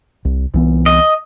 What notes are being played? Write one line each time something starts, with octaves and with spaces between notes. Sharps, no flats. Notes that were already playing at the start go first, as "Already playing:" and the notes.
C2
C2 E3 B3
D#5